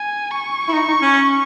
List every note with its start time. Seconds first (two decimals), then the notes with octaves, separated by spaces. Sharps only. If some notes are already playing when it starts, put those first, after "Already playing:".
Already playing: G#5
0.31 C#6
0.68 E4
0.73 D#4
0.88 D#4
1.02 C#4